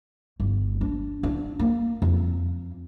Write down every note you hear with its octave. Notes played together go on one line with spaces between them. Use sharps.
G1
D4
D4
A#3
F2